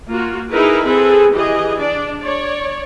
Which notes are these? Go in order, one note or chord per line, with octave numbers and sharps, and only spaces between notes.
A#3 F4 F#4
D#4 E4 G#4 A#4 B4
C4 G#4 A4 B4
E3 G4 G#4 D#5
D4 D5
C#5 D5